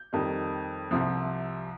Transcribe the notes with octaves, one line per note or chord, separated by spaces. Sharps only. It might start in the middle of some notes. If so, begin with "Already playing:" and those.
Already playing: G6
F2 D#3 G3
C2 C3 F3